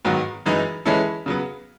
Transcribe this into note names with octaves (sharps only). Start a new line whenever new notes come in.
G#2 D#3 F#3 B3 F#4
F#2 E3 G#3 D#4
E3 G#3 C#4 E4 A4
C#3 F#3 B3